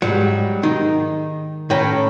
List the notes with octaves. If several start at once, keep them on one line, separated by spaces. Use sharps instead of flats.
G#2 F#3 G3
D#3 D#4
A2 C#4 B4 G5 A#5